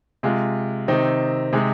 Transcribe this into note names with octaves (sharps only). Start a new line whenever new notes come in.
C3 G#3 F4
C3 D#3 C4 D#4
C3 G#3 D#4